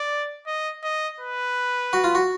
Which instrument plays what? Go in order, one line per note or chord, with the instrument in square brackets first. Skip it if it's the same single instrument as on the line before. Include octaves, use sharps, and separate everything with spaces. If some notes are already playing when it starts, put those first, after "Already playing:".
Already playing: [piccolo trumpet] D5
D#5
D#5
B4
[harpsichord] F#4
F4
F#4